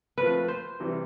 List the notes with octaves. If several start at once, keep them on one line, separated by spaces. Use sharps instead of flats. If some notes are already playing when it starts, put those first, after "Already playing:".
F3 A3 C4 F4 B4
C5
C3 E3 G3